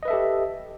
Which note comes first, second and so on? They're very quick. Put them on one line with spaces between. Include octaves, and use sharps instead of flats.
D#5 B4 E5 A4 G4